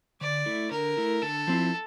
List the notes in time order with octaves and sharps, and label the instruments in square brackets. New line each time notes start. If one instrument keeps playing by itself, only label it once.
[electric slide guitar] D3 [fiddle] D5
[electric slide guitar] A3 E4
[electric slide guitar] D3 [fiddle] A#4
[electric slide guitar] A3 E4
[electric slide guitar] D3 [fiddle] A4
[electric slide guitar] F3 C4 E4